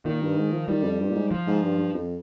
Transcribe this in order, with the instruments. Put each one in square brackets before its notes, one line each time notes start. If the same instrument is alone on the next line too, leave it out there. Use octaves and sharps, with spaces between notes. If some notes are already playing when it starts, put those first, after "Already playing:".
[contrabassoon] A#2 [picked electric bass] D#3
[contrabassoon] G2
G#2
F3
[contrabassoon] D#3 [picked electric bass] G3
[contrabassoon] F2
G2
A#2
G#2
[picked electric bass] F3
[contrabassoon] G#2
G2
G2
F2